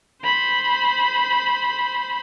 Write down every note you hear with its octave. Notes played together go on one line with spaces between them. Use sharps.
C5 B5